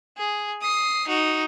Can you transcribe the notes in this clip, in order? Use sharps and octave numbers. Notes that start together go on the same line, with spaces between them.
G#4
D#6 C7
D#4 F#4